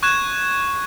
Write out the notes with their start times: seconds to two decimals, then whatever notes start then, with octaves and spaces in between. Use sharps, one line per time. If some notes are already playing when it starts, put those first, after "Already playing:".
0.03 C#6 F#6 G#6 E7